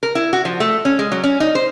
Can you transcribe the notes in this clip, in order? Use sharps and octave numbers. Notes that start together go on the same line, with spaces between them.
A#4
E4
F#4
F3
A3
C#4
G#3
F#3
C#4
D#4
C5